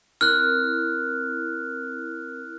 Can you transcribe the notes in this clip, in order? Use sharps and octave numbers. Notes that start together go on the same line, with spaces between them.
C4 E4 A#4 F6 F#6